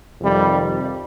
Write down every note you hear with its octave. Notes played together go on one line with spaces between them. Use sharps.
F2 C3 D#3 G3